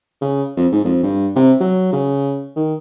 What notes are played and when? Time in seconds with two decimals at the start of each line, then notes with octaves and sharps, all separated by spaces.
0.21 C#3
0.57 F2
0.72 G#2
0.85 F2
1.03 G2
1.36 C3
1.60 F#3
1.93 C#3
2.56 D#3